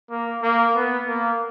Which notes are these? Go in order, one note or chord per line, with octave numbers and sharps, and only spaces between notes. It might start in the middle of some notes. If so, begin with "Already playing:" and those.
A#3
A#3
B3
A#3